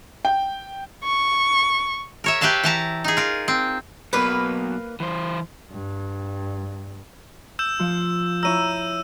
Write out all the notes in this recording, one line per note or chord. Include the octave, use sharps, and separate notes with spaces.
G5
C#6
A#4 C#5 E5
G4 B4 E5 F5 A5
E3 A5 A#5
D#4 G#4
F4 A#4
C4
B1 B2 A#3 B4
E3 C5
G2
E6 G6 E7
F3 F5
E4 C#5 A#5 E6 D#7